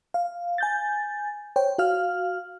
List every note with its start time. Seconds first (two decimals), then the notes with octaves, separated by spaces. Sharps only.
0.14 F5
0.58 G#5 G6 A6
1.56 C5 C#5 G5
1.78 F#4 F5 F6